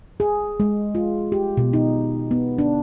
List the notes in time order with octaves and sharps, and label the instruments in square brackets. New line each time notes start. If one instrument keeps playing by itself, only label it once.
[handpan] G#4
G#3
F4
G4
B2
D#4
B3
D4